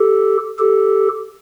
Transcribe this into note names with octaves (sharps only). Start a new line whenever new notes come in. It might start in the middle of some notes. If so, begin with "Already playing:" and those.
Already playing: G4 A4
G4 A4